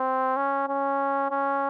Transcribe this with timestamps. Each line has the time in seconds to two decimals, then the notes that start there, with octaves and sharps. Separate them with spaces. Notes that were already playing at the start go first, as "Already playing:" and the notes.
Already playing: C4
0.36 C#4
0.68 C#4
1.31 C#4